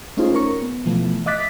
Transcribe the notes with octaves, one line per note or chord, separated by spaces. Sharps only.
A3 C#4 D#4 F4 G#4 C5
C#4 A#4 C#6
B3
B2 E3 F3 A3 B3
D#5 E5 D6 F#6 A6 B6